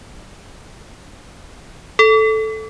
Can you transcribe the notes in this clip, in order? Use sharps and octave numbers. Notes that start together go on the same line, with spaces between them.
A4